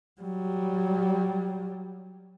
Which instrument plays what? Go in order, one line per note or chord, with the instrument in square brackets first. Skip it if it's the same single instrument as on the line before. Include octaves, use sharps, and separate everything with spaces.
[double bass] F#3 G3